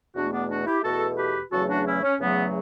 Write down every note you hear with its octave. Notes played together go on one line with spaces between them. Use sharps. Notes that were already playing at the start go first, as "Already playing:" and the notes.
E2 B2 A3 D4 F#4
B3 D4
D4 F#4
E4 G4
E2 B2 A3 F#4 A4
G4 B4
E2 C#3 F#3 A3 F#4 A4
D4 F#4
C#4 E4
C#4
E2 C#3 F#3 A3 B3